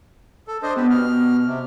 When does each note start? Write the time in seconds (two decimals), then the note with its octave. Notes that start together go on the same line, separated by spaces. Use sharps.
0.48 A4
0.63 D4 C5 D#5
0.76 B3 G4 B4
0.90 B2 F6
1.45 C3